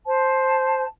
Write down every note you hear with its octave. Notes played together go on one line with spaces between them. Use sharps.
C5 A5